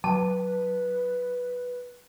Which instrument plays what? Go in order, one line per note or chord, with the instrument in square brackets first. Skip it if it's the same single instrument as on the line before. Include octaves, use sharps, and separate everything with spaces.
[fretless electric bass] F#3 [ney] B4 [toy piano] A5